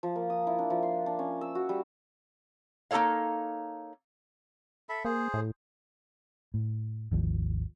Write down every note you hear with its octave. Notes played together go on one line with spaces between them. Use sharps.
F3
A#3
D#6
E4
D4
F3
C6
D4
C#4
E6
F#4
G3
A#3 D#4 G#4 A4 C#5 F5
A4 E5 B5
A#3 G#4 C5
A2
A2
G#1 D#2 F3